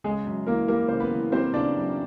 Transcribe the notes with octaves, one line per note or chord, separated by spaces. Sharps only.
C#3 G#3 G#4
F#2
E3 A#3 A#4
G3 A#3 A#4
C#3 C5
B3 B4
E3
G3 C4 C5
C#3 D4 D5
F#2